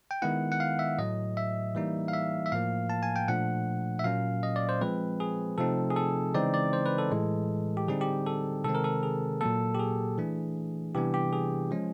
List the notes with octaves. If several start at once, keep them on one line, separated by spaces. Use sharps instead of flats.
G5
D#3 G#3 B3 E4 F#5
F#5
F5
E5
A2 F#3 A3 D#5
E5
E3 G3 A#3 D#4
F5
E5
E5
A2 F3 A#3 F5
A5
G#5
G5
A#2 F3 A3 D4 F#5
E5
A#2 F#3 A#3 C#4 F5
D#5
D5
C5
F3 G#3 C4 B4
G#4
C3 F3 A3 C4 D#4 A4
G#4
A4
C#3 E3 G#3 C4 D#4 D5
D5
C5
B4
A4
A2 E3 G#3
G4
D3 G3 C4 D#4 G#4
G4
A4
C3 D#3 G#3 C4 A4
A#4
A4
G#4
A#2 F#3 A#3 A4
G4
G#4
E3 A3 D4
C3 E3 G3 B3 D4 G4
G4
G#4
F3 G#3 C#4